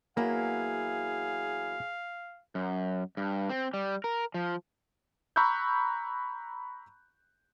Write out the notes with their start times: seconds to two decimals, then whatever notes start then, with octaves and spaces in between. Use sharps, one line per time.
0.17 E2 F#3 A#3 E4 G#4 F5
2.55 F#2
3.17 G2
3.49 C4
3.74 G3
4.04 A#4
4.34 F3
5.36 A#5 B5 C#6 E6 F#6 G6